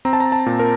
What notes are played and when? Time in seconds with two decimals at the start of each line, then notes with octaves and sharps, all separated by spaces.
0.05 C4 A#5
0.13 A5
0.20 A#5
0.32 A5
0.46 A#2
0.59 A#4